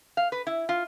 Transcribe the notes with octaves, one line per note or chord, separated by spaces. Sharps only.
F5
B4
E4
F4